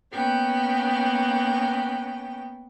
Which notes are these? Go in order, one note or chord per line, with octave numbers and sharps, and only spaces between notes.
A#3 B3 C#4 G5